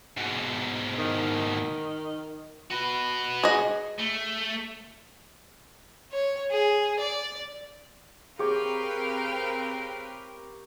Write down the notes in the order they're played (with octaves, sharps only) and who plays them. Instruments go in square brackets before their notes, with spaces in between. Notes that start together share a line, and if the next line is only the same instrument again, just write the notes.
[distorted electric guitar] G#2 B2
[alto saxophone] D#3
[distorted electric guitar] F#4 B4
[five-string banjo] G#4 D#5
[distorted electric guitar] A3
[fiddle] C#5
G#4
D5
[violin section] C4 A#4 [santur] G4 C#5 [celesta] G#4 [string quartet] B4 F5 G5